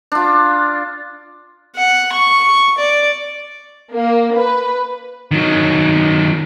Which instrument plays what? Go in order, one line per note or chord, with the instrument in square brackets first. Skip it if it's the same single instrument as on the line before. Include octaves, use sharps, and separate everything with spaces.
[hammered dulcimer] D4 F4
[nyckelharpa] F#5
C#6
D5
[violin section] A#3
B4
[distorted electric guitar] D#3 F#3